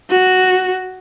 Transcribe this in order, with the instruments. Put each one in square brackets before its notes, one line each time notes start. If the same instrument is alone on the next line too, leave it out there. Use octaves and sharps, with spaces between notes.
[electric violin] F#4